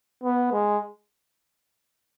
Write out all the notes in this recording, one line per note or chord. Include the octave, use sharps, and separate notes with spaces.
B3
G#3